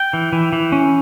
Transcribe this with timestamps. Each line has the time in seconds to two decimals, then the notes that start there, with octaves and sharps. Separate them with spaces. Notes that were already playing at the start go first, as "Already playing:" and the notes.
Already playing: G5
0.13 E3
0.33 E3
0.53 E3
0.72 C#4